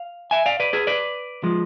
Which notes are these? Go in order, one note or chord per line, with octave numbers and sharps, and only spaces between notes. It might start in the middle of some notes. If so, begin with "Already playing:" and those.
Already playing: F5
E5 G#5
D5 F5
B4 D5
G#4 B4
B4 D5
F3 G#3